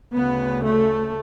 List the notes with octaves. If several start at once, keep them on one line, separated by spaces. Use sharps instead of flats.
D2 C#3 B3
A3